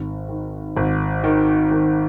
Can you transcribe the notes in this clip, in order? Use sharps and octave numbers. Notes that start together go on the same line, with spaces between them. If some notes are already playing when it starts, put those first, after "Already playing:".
Already playing: G#1
D#3
G#1
D#3
D#3